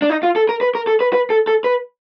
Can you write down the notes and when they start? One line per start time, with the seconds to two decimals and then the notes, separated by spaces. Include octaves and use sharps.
0.02 D4
0.10 D#4
0.23 F4
0.36 A4
0.49 A#4
0.61 B4
0.75 A#4
0.87 A4
1.01 B4
1.13 B4
1.30 A4
1.47 A4
1.64 B4